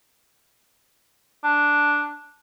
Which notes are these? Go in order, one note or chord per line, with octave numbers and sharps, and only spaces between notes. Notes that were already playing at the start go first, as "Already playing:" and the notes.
D4